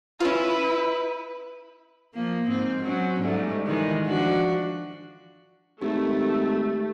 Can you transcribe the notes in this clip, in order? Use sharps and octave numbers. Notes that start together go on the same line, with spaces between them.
C#4 E4 F4 B4
F3 A#3
G#2 C4
F#3 C4 C#4
G#2 G3 A3
D#3 E3 G#3
F3 D4 F#4
G#1 A3 G4